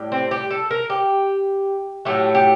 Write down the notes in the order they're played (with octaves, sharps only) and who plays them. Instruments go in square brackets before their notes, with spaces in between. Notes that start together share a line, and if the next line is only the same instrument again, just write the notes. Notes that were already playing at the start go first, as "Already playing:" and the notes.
Already playing: [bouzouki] A2 G3
C4
G4
A4
A#4
G4
A2 F#3 A3 G4
G4